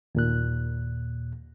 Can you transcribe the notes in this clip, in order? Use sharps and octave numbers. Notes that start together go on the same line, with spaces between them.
D#2 A#2 F#6